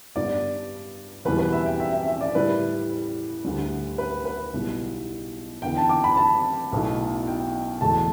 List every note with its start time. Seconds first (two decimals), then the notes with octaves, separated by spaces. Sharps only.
0.16 G2 G3 B3 D4 D5
1.25 E2 B2 G3 E4 B4
1.39 B4
1.53 E5
1.66 G5
1.80 E5
1.93 E5
2.08 E5
2.21 D5
2.35 A2 G3 E4 B4
3.45 D2 D3 G3
3.98 B4
4.25 B4
4.54 B1 B2 G3 E4
5.62 E2 D3 B3 E4 G5
5.77 A5
5.89 D6
6.04 B5
6.17 A5
6.72 B1 B2 A3 E4
7.27 G5
7.81 E1 E2 E3 A3 A5